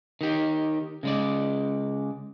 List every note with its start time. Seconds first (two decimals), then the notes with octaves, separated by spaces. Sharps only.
0.21 D#3 G4
1.03 C#3 G#3 D5